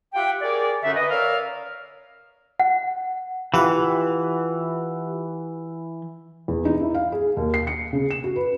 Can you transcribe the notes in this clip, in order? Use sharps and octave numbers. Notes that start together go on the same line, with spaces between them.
F4 G4 E5 F#5 G5
G#4 A#4 C#5 D5
F#2 D3 C#4 D#4 F#4 E5
B4 D#5
A#4 C#5 D5 E5 F5
F#5
E3 F4 G4 F#5
E2
D#4
E4
F5
G#4
D#2
C7
C#7
C#3
E7
F#4
B4